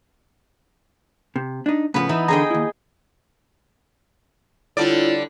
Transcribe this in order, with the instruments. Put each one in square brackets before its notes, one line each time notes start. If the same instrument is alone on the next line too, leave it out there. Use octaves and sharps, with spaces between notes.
[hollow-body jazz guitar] C3
D4 D#4
[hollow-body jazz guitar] A2 C#3 F3 [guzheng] B3 B4
[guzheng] E3 D#4 [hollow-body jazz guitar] E4
[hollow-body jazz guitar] D3 A#5 [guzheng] G#4 D#5 G5
[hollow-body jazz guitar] D#2 E4
[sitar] D3 G3 D5 [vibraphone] E4 F4 C#5